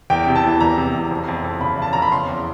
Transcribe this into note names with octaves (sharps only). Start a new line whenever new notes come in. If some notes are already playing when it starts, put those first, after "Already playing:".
E2 G5
C3
A5
E3
E2 A#5
C3
E2
F2
F2
F2
C#3 B5
C#3 A5
F2 A#5
B5
C#3 C6
E2